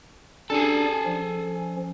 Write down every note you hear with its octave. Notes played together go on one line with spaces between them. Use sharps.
C#4 D4 G#4 A4 D5
F3 C#4